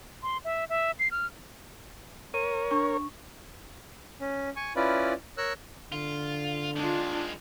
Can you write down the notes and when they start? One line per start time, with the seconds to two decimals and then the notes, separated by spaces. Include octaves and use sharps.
0.23 C6
0.45 E5
0.69 E5
0.99 C7
1.11 F6
2.34 A#4 C#5 D#7
2.71 D4 C#6
4.21 C#4
4.56 G#5 C#6
4.76 C#4 E4 F4 B4 D5
5.38 A#4 C#5 E6 F#6
5.92 D3 F4
6.76 D#3 G#3 D4 F4